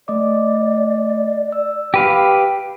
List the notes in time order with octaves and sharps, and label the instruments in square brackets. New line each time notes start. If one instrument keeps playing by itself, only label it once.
[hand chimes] A3 D#5 D6 [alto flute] D5
[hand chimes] E6
[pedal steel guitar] G4 B4 F5